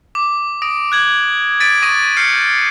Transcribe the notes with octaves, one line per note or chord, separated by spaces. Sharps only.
D6
D#6 A#6 D7
F#6 G#6 F#7
A6 B6 D7 D#7
C#6 D#6 A#6 D#7
F6 G6 A#6 C7 C#7